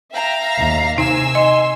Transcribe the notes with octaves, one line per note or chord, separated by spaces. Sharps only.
E5 F5 G5 A#5
D#2 C7
C3 D#4 G#5 E6
D#5 C6